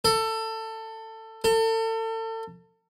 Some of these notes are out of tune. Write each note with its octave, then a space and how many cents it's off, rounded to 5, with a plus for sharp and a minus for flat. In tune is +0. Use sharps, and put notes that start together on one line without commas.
A4 +20
A4 +35